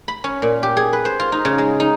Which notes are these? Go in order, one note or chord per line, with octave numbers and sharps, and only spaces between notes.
B5
C#4
A#2
G4
G#4
B4
C5
F4
D#4
C#3
G#3
D#4